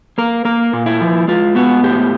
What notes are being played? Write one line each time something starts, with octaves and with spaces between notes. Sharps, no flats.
A#3 A#4
A#3 A#4
A#2
E4
F3
G#3 F4
B3 F#4
A2 G4